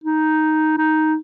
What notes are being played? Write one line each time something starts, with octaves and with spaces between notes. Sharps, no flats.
D#4
D#4